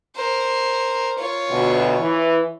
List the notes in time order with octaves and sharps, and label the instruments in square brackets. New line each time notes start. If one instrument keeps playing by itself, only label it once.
[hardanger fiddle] A#4 C5
F4 C#5
[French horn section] D2 B2
E3